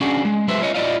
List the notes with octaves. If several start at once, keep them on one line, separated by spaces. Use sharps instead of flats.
C#4 D4 F#4 G#4
G#3
F#3 G#3 B4 C5 E5
F4 C#5 D#5
E4 F4 D5 D#5 F5